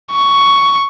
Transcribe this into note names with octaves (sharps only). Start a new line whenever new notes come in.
C#6